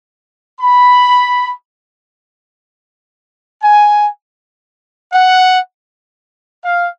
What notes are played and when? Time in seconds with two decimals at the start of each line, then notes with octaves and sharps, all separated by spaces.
0.61 B5
3.62 G#5
5.13 F#5
6.64 F5